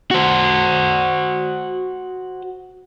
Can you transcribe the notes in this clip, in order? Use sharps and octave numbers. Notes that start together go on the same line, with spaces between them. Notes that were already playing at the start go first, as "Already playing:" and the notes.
F#4 C5